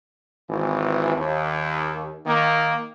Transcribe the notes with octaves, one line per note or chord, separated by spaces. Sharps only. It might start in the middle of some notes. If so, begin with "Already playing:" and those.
G#1 E3
D#2
D#3 A#3